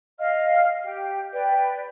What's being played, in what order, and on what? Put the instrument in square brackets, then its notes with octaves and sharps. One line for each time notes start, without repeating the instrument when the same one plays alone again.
[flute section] D#5 F5 F6
G4 G5
B4 D5 G5